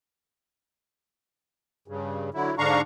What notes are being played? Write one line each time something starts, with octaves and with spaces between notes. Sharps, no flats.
G2 C#3
D3 F#3 E4
G#2 D3 D4 F5 A#5 C#6